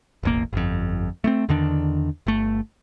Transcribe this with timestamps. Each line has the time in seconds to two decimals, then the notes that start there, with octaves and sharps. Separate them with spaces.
0.23 E1 A1 A#3
0.53 G1 F2
1.24 A3 A#3 C4
1.49 E2 D3 D#3 D4
2.27 G1 A3